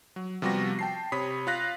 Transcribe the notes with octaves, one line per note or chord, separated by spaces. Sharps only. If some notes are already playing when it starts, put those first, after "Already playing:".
F#3
C3 F3 G3 B3 F#4 A#6
G5 A5 C7
C3 C#5 B5 D#6 B6
F4 F5 F#6 A#6 B6